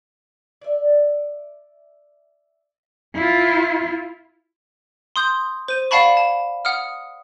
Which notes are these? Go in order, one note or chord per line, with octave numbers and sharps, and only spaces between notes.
D5 E5
E4 F4
C6 D#6 G6
C5 D#7
D5 F5 F#5 A5 B5 C#6
A5
F#5 D#6 F6